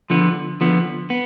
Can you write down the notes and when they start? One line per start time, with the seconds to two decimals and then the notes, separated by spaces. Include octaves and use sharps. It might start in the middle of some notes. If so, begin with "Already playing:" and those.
0.10 D3 F3 B3
0.61 D3 F3 B3
1.10 B3